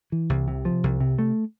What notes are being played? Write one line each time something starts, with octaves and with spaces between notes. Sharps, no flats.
E3
C2
C3
F3
C2
C3
A3